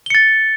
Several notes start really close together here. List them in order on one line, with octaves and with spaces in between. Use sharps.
G7 C#7 A6